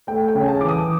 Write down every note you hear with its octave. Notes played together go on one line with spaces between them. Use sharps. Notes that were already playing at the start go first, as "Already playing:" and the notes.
A3 G5
G5
C#3
G#5
A5
E3 D6
D#6